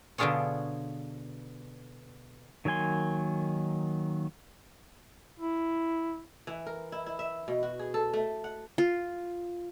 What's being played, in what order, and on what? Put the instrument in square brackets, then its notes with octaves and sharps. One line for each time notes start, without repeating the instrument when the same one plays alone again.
[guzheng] B2 D3 D4 F4 G#4 C#5
[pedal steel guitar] D#3 F#3 A#3 G#5 C6
[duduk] E4
[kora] E3
A#4
E4
E4
E5
B2
F#4
G#4
A4
A3
F#5
[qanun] F4